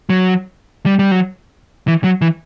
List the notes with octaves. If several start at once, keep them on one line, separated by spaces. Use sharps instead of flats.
F#3
G3
G3
F#3
E3
F#3
E3